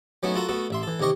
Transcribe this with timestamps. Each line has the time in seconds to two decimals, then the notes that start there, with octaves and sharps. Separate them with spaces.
0.23 F#3 A3 B3 C#4 D#4 E4
0.35 F4 F#4 A4 A#4 F#5
0.48 A3 B3 F#4 A4
0.70 A1 E5 C6
0.83 E3 A4
1.00 D#2 C3 G4 D#5 C#6